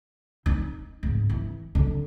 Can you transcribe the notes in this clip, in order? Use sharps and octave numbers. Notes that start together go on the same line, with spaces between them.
D#4
G#2
E3
D3